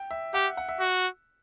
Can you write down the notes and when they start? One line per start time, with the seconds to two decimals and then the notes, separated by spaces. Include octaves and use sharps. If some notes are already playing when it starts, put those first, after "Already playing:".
Already playing: G5
0.11 E5
0.34 G4 F#5
0.57 F#5
0.69 E5
0.80 F#4